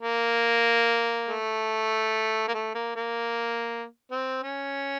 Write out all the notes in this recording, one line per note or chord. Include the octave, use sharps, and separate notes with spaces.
A#3
A3
A#3
A3
A#3
A#3
C4
C#4